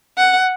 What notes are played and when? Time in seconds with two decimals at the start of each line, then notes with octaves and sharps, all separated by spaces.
0.17 F#5